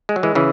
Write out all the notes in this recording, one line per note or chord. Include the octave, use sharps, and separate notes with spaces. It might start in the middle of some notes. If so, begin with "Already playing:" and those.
G#3
F#3
E3 G#3
C#3 E3